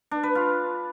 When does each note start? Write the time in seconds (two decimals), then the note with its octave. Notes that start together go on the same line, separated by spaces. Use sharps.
0.11 D4
0.23 B4
0.35 F4